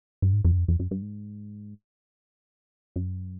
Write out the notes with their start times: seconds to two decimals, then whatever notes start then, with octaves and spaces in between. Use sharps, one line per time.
0.22 G2
0.33 G#2
0.45 F2
0.52 F#2
0.57 F2
0.68 F2
0.79 F#2
0.91 G2
1.02 G#2
2.96 F#2